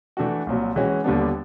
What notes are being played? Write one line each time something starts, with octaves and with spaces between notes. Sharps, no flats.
E3 A3 D4 F#4
C2 A#2 F#3
E3 G#3 C#4 F#4
D#2 D3 G3 B3 D4